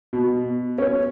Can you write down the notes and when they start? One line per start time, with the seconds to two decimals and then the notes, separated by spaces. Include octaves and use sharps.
0.13 B2
0.78 C#4